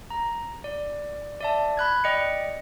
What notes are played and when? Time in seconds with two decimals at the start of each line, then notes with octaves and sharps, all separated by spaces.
0.10 A#5
0.64 D5
1.41 D5 E5 A5
1.77 B5 F#6 G#6
2.04 D5 D#5 G5 C#7